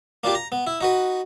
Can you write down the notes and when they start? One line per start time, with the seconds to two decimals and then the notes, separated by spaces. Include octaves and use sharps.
0.24 A#3 D4 F4 G4
0.35 A#5
0.52 B3
0.67 E4
0.81 D#4 F#4 B4